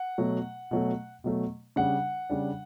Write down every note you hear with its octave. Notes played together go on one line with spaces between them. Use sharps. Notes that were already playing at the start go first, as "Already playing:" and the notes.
Already playing: F#5
B2 F#3 A3
B2 F#3 A3
B2 F#3 A3
C#3 G3 D4 F#5
C#3 G3 D4